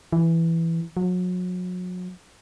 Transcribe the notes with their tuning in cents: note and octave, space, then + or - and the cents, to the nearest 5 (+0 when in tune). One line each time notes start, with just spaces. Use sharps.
E3 +5
F#3 -35